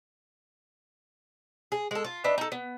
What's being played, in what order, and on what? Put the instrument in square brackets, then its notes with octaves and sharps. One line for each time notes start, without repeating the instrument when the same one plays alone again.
[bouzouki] G#4
G#3 A4
F4
D4 D#4 B4 E5
D#4 A4
B3